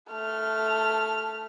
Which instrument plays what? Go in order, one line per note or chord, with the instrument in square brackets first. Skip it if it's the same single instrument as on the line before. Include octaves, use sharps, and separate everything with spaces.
[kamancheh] A3 F6